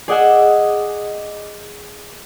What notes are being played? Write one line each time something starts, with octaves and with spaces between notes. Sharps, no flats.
G#4 D5 D#5 F#5 G#5 E6